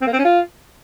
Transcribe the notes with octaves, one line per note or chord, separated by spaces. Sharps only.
C4
A#3
C4
C#4
F4